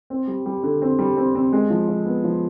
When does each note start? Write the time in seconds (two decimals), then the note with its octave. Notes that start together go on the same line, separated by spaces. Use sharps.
0.10 C4
0.28 G3
0.46 G3
0.64 D3
0.82 C4
0.99 G3
1.17 C4
1.35 C4
1.53 G#3
1.70 F3
1.88 F3
2.06 B3
2.24 F3